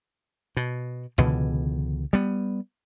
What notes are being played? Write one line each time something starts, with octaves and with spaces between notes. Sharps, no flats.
B2
C#2 B2 D3 E3
G3 B3